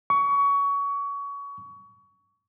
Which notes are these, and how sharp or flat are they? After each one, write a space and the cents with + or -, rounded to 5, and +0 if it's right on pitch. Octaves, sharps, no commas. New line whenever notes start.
C#6 +25